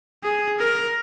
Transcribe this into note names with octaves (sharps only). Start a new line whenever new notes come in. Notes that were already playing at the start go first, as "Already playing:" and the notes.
G#4
A#4